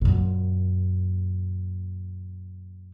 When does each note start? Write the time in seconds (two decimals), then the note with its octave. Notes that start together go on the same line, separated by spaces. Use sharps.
0.02 F#2 A#2